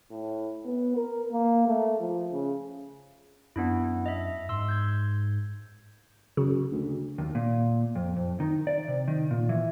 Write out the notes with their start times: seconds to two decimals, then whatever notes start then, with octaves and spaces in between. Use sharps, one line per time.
0.11 A2
0.65 B3
0.96 A#4
1.32 A#3
1.68 A3
2.00 F3
2.32 C#3
3.56 F#2 B3 D4 E4
4.06 D#5 E5
4.49 G#2 C6 E6
4.69 G6 G#6
6.37 F#2 C#3
6.71 D2
7.18 D#2
7.35 A#2
7.95 F2
8.17 F2
8.40 D#3
8.67 D5
8.88 C3
9.08 D#3
9.31 A#2
9.49 E3